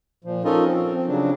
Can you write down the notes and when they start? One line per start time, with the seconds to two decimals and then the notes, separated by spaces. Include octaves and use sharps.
0.24 A#2 F3
0.45 C#4 D#4 F4 A4 A#4 D#5
0.65 F3 C4
0.94 C4
1.08 C#3 F#3 D4